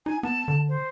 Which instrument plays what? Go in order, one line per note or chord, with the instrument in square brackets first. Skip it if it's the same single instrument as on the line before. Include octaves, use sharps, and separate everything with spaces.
[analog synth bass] D#4 [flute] G#5
[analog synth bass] B3 [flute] A5
[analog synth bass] D3
[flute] C5